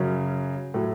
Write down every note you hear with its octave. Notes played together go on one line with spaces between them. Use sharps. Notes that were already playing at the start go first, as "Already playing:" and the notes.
Already playing: F#2 C#3 F#3 C#4
A2 F#3